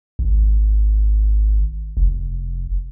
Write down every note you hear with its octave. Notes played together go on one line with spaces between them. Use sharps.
G#1
F1